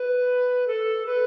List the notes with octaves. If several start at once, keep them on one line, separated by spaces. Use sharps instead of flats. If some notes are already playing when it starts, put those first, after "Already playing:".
Already playing: B4
A4
B4